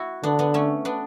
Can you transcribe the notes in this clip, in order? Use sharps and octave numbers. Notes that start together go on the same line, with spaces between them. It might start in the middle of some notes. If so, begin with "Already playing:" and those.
Already playing: E4 F#4
D3 B3 D4
B3 D4
A3 C#4
B3 D4